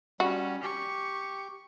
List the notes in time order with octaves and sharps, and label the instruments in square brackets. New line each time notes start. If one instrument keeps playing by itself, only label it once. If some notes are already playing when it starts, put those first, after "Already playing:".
[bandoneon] G3 [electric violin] C#4 [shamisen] F#4
[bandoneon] G4 [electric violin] C#6